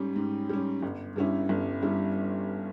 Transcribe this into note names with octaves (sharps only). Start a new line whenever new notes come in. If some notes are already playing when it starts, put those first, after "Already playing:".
Already playing: G#2 G3 C#4
G#2
G3 C#4
G1
G2 G3 C#4 E4
G1
G2 G3 C#4 E4